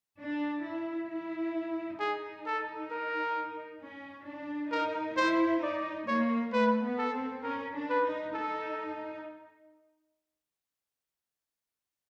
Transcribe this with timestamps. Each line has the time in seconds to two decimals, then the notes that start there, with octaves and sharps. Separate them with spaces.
0.19 D4
0.64 E4
1.10 E4
2.00 D#4 G#4
2.46 A4
2.91 A#4
3.81 C#4
4.27 D4
4.71 D#4 A#4
5.17 E4 C5
5.62 D#4 D5
6.07 A#3 C#5
6.53 A3 B4
6.84 B3
6.98 A4
7.13 C4
7.43 C#4 A#4
7.74 D4
7.89 B4
8.03 D#4
8.34 D#4 A4